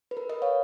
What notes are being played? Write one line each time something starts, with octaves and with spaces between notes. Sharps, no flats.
B4
A#4
B4 D#5
C#5 F5